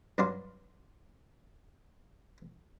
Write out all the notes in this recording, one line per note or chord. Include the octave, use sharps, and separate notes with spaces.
G2 F#3 D4 D5 F5 C6